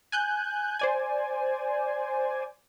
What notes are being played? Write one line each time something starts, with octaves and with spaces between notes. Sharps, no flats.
G#5 F#6 G6
C5 D5 G#5